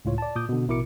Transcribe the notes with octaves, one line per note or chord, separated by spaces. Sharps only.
C#2 A2 F4 C#5
D5 A5
A#2 D6 D#6 G6
B2 D3
A1 B2 E4 A#4 D6 C#7